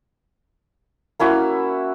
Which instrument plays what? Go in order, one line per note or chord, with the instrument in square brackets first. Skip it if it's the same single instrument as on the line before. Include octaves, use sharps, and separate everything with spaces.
[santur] A#3 C#4 E4 F#4